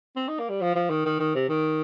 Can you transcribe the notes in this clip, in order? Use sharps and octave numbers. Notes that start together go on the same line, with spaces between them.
C4
D#4
A#3
G3
F3
F3
D#3
D#3
D#3
C3
D#3